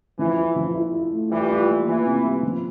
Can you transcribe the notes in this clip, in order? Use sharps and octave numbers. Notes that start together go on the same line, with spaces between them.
E3 F3
E4
F3
E4
E4
A3
E3 G3 F4
F4
A#3
E3 F4
C3
G3
F3